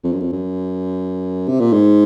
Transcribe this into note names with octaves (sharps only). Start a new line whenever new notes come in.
F2
F#2
F2
F#2
C3
A#2
G#2